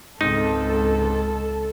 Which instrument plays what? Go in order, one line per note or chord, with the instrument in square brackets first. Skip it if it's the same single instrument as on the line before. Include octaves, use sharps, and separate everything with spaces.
[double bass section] C#2 [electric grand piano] G#2 C4 [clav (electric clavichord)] D#4 [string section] A4